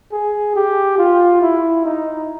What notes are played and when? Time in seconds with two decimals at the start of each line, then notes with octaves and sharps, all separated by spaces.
0.12 G#4
0.55 G4
0.98 F4
1.42 E4
1.85 D#4